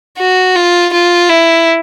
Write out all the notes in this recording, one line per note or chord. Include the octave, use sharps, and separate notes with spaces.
F#4
F4
F4
E4